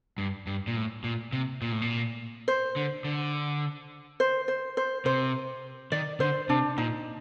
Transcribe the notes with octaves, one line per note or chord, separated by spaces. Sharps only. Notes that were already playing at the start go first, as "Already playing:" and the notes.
G2
G2
A#2
A2
A#2
C3
A#2
A2
A#2
C5
D3
D3
C5
C5
C5
C3 C5
D#3 D5
D3 C5
C3 D4
A#2 D#4